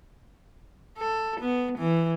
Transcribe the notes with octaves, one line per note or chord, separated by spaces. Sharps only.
A4
B3
E3